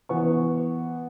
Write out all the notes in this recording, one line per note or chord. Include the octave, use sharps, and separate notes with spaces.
E3 B3 C#6